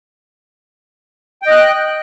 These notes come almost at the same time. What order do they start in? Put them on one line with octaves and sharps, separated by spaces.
G5 D#5 F#6